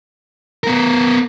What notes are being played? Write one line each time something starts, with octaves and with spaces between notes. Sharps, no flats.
B3 A#4